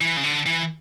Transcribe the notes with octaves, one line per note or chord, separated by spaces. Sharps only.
E3
C#3
D3
E3